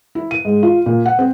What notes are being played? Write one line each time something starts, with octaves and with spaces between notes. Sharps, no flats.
E4
D#7
G#2
F4
A#2
F#5
C4